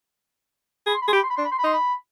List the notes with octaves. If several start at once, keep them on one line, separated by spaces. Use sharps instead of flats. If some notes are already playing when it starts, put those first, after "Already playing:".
G#4 B5
C6
B5
G#4 C6
G4 B5
C6
B5
D4 C6
B5
C6
B5
D#4 C6
B5